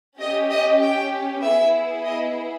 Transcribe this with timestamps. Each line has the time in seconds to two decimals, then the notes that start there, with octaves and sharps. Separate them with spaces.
0.20 C#4 G4 D#5
0.51 D#5
0.82 G5
1.43 B3 E4 G#4 E5
2.06 D#5